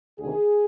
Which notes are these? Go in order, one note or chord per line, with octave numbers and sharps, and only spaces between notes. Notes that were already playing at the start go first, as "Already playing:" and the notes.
D2 C3 D#3 G#4